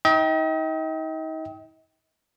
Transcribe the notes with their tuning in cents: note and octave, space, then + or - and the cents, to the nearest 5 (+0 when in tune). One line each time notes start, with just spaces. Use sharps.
D#4 +35 D#5 +40 G5 -10